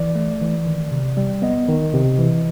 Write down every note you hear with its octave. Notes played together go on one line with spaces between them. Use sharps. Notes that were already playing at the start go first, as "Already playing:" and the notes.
Already playing: E3 D5
A3
E3
D#3
C3
G3
B3 D#5
D#3
C3
E3